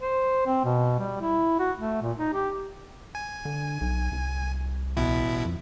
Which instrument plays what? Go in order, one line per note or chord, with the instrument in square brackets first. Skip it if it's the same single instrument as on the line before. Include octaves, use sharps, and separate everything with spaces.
[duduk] C5
C4
B2
G3
E4
F#4
A3
A#2
D#4
G4
[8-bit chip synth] G#5
[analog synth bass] D3
B1
C2
[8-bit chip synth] A1 B2 E4
[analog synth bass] F2